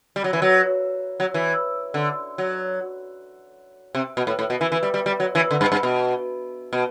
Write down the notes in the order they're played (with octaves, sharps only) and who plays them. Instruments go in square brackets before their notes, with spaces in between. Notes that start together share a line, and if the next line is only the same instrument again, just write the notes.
[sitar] G3
F#3
E3
F#3
F#3
E3
D3
F#3
C3
B2
A2
A2
B2
E3
E3
G3
G3
G3
F#3
E3
D3
G2
G2
B2
B2